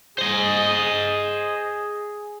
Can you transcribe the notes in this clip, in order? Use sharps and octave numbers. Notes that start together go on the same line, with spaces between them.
G#4 C5 D#5